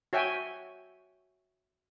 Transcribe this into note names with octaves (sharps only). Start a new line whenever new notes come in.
F#4 C#5 E5 G5 G#5